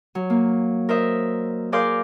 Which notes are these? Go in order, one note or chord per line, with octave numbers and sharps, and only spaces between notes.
F#3
A#3
A#4 C5 D#5 E5
G#4 A#4 D5 F5 C6 G6